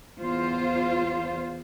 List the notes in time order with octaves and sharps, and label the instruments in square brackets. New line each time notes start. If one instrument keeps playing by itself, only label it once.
[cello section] E2 F4 C5